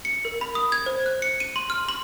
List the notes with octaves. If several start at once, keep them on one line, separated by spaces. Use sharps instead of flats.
C#7
A#4
B5
D#6
G#6
C5
F#6
C#7
D#7
C6
F6
C6